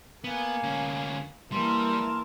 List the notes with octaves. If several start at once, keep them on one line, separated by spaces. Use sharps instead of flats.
A#3 B3 G#5
D2 C#4
E3 G3 A#3 A#4 A5 C6